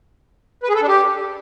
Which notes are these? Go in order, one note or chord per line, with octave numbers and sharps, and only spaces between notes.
B4
G#4
A4
D4
G4